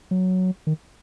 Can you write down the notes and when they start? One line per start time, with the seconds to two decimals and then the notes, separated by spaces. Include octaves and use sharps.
0.11 F#3
0.67 D#3